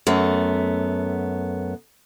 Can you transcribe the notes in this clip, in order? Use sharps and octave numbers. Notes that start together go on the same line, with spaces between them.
F#2 A3 B3